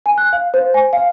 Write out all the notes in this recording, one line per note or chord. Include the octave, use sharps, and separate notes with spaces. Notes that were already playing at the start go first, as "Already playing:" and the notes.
G#5
F#6
F5
C5
G#5
F5